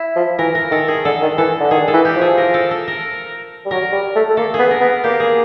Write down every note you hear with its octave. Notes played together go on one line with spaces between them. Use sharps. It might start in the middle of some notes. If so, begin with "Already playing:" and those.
Already playing: E4
F3
E3 A#4
A#4
D#3 A4
G#4
D3 A4
D#3
E3 A4
D3
D#3 G#4
A4
E3
G4
F3
G#4
A#4
A4
A4
A#4
G3
F#3 A#4
G3
A3
A3
A#3 A4
B3 G#4
A#4
B3
A#3 G4
G#4